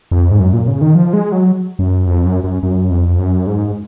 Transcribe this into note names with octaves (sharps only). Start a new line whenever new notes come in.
F2
G#2
F#2
A#2
C#3
D#3
F3
G#3
F#3
F#2
F2
F#2
F#2
F#2
F2
F#2
G#2